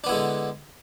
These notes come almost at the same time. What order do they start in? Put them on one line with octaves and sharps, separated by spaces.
D4 B3 E4 G#3 D3